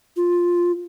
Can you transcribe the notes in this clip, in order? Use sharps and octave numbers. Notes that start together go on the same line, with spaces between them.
F4